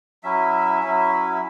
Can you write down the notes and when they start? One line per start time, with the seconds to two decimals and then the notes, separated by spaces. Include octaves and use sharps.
0.24 F#3 C#4 E4 E5
0.82 F#3 C#4 E4